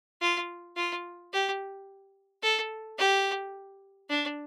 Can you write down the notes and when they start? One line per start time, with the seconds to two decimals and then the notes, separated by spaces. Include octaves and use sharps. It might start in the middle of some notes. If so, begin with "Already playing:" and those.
0.21 F4
0.77 F4
1.33 G4
2.43 A4
2.99 G4
4.09 D4